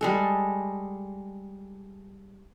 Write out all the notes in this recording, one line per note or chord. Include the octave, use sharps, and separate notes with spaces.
G3 G#3 A4